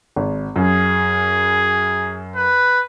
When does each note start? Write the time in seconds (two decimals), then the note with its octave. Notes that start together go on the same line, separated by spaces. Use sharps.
0.16 G#1
0.56 F#2 G#4
2.36 B4